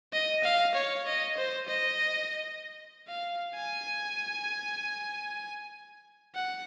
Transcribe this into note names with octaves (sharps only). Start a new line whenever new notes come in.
D#5
F5
C#5
D#5
C5
D#5
F5
G#5
F#5